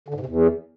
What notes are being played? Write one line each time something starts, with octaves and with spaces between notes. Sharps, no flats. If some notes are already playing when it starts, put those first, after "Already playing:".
D3
G#2
C3
E2